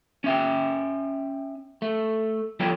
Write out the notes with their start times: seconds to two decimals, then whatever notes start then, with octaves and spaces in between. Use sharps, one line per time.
0.24 C#4 E5 G5
1.82 A3
2.60 F2 G3 F4 A4 C#5 G5